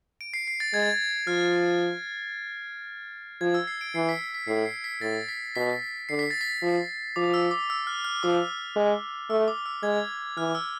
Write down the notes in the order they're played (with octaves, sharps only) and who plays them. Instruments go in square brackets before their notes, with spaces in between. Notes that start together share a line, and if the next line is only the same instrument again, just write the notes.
[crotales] D7
C7
C7
A6
[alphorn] G#3 [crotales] G#6
[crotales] A6
G#6
[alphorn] F3 [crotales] F6
[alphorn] F3 [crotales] G#6
[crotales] E6
C7
D7
[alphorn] E3 [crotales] C7
[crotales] B6
B6
[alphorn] A2 [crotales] C7
[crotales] C7
B6
[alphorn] A2 [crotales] A6
[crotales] B6
[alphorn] B2 [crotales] B6
[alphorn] D3 [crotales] C7
[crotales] B6
A6
B6
[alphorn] F3
[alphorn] F3 [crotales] D6
[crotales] E6
D6
E6
F6
F6
[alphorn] F3 [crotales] D6
[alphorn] G#3
[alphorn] A3 [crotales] E6
[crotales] D6
E6
[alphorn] G#3 [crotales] G#6
[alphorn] E3 [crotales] F6
[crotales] E6